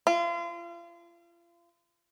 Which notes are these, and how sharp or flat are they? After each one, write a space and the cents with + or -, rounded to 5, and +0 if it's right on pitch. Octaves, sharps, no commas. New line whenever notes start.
F4 -35